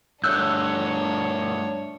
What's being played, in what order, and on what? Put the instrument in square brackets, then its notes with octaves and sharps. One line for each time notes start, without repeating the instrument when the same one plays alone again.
[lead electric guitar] G2 A3 [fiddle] D4 C#5 [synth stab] E6 F#6 G6